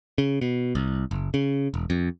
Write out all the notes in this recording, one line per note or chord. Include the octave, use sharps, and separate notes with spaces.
C#3
B2
C2
F#1
C#3
E1
F2